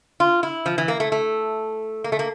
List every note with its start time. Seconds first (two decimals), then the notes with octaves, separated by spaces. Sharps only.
0.20 F4
0.43 E4
0.66 F3
0.78 E3
0.88 A#3
1.00 A3
1.12 A3
2.04 A#3
2.12 A3
2.19 A#3